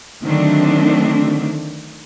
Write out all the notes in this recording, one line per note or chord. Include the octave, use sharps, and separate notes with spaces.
D3 D#3 F#3 A3 C4 D4